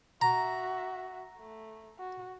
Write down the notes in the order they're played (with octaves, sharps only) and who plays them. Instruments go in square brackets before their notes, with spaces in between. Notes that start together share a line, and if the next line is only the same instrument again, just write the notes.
[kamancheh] F#4 E5 [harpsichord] A#5
[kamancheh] A3
F#4